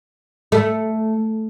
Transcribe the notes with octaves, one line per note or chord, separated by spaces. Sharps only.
A3